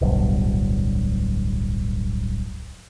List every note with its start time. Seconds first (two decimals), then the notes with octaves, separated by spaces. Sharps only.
0.01 D1 B1 G2